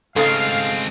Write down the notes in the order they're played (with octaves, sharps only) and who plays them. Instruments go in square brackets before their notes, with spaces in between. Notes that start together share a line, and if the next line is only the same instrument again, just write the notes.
[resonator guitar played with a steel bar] G#2 C#3 A3 [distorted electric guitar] G#3 C4 [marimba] A4 [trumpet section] F5